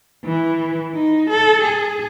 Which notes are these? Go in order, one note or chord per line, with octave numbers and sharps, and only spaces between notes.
E3
D#4
A4
G#4